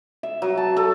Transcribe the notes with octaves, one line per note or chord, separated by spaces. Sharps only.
E5
F#3
A5
A4